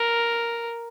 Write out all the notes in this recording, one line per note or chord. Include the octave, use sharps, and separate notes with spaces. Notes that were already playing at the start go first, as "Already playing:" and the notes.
Already playing: A#4